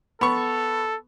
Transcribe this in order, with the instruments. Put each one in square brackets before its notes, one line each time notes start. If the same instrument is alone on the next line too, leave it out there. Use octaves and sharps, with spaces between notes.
[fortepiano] B3 C#6 [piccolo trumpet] A4